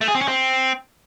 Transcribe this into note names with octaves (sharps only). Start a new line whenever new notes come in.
A3
G#4
C4
C#4
C4